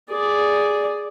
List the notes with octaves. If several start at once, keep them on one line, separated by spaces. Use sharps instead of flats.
G#4 D5